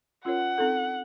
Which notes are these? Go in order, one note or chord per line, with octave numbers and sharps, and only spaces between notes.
C#4 F4 A#4 C#5 F#5
C4 D#4 A4